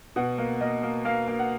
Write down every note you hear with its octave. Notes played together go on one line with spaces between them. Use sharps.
B2 F#5
A#3
A#3 D#5
A#3
A#3 F5
A#3
F#5